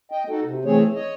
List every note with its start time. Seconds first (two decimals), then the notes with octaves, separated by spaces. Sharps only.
0.11 D#5 G5
0.29 D#4 F#4 A4
0.44 C3
0.65 E3 A3 C4 G#4 C#5
0.94 C#5 D#5